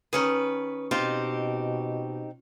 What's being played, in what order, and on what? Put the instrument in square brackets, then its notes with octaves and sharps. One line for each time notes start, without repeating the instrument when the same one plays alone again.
[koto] D#3 C#4 G#4 [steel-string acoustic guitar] B4
[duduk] B2 [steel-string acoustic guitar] C4 D#4 G4 [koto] F4